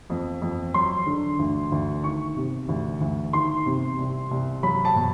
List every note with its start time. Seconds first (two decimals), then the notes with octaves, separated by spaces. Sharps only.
0.10 F2
0.42 F2
0.74 F#3 C6
1.06 D3
1.39 D2
1.72 D2
2.04 D#3 C#6
2.36 C3
2.69 D2
3.01 D2
3.33 D#3 C6
3.66 C3
3.98 C2
4.31 C2
4.63 F#3 B5
4.85 A5
4.96 B2